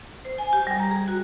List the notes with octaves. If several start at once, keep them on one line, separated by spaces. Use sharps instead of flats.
C5
G#5
G4
G3
A#5
G#4
F#4